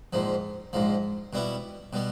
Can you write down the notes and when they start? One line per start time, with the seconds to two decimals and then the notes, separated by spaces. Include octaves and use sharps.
0.13 A#1 G#2 F3
0.73 A#1 G#2 F3
1.33 B2 G3 B3 E4
1.93 B2 G3 B3